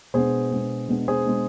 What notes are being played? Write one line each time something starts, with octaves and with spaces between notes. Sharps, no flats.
B2 G#3 B3 D4 G#4 C5
B2 G#3 B3 D4
B2 G#3 B3 D4
G#4 C5
B2 G#3 B3 D4